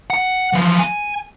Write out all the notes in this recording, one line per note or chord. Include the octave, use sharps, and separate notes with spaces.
F#5
E3 F3
G#5